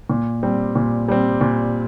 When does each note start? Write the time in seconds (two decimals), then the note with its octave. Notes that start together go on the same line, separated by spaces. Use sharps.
0.09 A#2
0.43 G3 C4
0.76 A#2
1.08 G3 C4
1.41 A#2